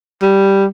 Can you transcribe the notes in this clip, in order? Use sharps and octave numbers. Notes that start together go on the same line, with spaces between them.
G3